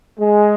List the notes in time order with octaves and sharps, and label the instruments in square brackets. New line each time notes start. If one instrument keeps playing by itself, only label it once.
[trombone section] G#3